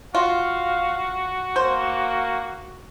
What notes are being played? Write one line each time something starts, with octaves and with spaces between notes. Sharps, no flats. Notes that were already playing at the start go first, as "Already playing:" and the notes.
F4 F#4 F5
A#3 C5